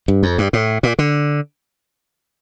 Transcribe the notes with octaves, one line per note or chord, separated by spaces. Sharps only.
G2
F2
G2
A2
A#2
D3